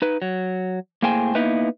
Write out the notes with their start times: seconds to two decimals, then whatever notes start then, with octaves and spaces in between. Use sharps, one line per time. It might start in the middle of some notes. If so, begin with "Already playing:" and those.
0.02 D#4 B4
0.22 F#3
1.02 A2 A#3 G#4 C5 G5 G#5
1.35 A#3 B3 D#4 E4 B4